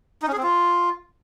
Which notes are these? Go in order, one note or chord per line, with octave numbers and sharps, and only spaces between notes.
D#4
C#4
G#4
C4
F4